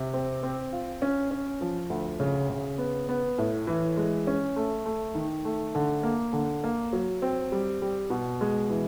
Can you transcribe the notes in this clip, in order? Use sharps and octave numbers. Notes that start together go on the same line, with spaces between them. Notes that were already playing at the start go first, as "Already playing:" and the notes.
Already playing: C3
C4
C4
F4
C#4
C#4
F3
D2
C#3
C#3
B3
B3
A2
E3
G#3
C#4
A3
A3
D#3
A3
D3
A#3
D3
A#3
F#3
C4
G3
G3
B2
G#3
E3